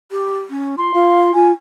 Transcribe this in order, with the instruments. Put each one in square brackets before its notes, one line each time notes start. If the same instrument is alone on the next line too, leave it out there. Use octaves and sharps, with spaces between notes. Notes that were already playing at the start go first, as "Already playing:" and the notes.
[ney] G4
C#4
[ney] F4 [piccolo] C6
[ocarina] F4 [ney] F5
[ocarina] F4 [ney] G#5